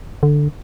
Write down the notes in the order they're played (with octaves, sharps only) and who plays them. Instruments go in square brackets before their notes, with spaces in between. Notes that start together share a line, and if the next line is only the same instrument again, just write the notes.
[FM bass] D3